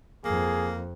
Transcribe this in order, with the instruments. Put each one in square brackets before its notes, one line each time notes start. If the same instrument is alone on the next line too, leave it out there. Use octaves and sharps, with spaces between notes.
[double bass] F2 [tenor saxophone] A#3 [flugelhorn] G#4